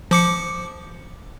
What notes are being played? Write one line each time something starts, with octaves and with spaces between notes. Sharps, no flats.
F3 D6 C#7